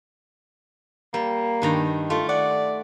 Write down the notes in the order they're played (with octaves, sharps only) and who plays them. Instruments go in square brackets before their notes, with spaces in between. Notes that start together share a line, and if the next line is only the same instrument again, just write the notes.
[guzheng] G3 [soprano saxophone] A#3
[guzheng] G2 D#3 A#5
[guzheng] A3 [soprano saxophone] F4
[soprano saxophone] D5 [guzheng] F#5